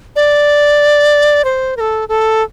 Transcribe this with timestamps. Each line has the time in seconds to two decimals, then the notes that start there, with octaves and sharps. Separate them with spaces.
0.16 D5
1.45 C5
1.77 A#4
1.80 A4
2.09 A4